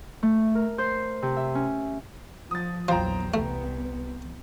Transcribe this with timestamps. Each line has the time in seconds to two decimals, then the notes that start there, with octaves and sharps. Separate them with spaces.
0.23 A3
0.55 A#4
0.78 C5
1.22 C3
1.37 E5
1.55 C#4
2.51 F3 D#6 A6
2.88 A#1 E2 F3 F#3 C5 G5 A#5
3.34 C2 A3 B3